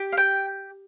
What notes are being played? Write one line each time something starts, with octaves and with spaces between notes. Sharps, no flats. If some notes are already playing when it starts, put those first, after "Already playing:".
Already playing: G4
F5
G5